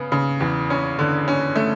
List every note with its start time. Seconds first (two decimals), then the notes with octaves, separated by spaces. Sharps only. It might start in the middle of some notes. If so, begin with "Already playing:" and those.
Already playing: C#3 B3
0.12 C#3
0.41 E2
0.70 C#4
0.99 D3
1.28 C#4
1.56 A3